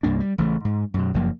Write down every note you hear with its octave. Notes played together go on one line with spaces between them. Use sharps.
C2 G2 A#3 D4
G3
A1 C#3 E3 A3
G#2
F#2 B2
F#1 F#2 F3 A#3